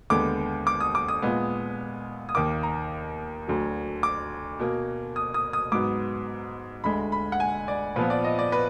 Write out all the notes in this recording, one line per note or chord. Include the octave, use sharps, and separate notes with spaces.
D#2 D3 G#3 B3 D6
D6
D#6
D6
D#6
A#2 G#3 B3
D#6
D#2 D#3 A#3 D6
A#5
D2 D3 F#3
D6
B2 A#3
D#6
D#6
D#6
G#2 F#3 B3 D6
D2 D3 G#3 B5
B5
F#5
G#5
D5
A#2 F3 B3 B4
D5
D#5
D5
B4